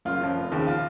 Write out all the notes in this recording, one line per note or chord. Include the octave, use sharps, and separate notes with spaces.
F#1 F4
F#2 F3
F1
D#2 C#3 F3
F4